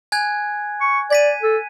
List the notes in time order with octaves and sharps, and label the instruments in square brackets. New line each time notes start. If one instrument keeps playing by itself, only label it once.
[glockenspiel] G#5 F#6 G#6
[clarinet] C#6
[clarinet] D5 [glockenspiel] G#6 B6 D#7
[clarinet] A4